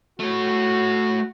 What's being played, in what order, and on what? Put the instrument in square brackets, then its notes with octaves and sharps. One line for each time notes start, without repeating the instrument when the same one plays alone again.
[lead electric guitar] A3 C#5 [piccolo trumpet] F#4